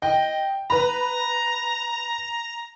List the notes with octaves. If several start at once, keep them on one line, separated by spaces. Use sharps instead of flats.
D#5 G5
B4 A#5 B5